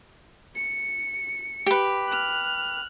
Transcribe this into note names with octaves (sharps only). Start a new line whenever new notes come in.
C#7
G4 B4
F6 F#6